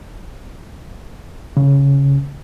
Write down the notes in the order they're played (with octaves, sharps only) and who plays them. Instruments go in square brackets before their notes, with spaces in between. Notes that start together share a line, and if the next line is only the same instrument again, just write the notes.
[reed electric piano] C#3